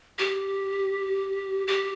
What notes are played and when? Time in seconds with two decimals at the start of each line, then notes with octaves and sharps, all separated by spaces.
0.19 G4
1.67 G4